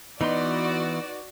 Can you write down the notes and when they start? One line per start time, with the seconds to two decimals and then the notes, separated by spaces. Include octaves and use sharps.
0.21 E3 B3 D#4 F#4 B4 D5 C6